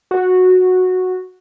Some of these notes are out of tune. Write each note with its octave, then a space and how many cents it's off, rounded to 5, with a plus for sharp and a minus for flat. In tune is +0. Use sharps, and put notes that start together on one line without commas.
F#4 -10